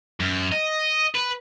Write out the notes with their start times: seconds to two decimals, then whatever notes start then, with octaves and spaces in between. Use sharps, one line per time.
0.20 F#2
0.52 D#5
1.15 B4